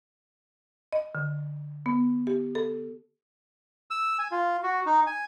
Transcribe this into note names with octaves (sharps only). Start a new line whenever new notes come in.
D#5
D3
B3
G4
A4
E6
G#5
F4
F#4
D#4
G#5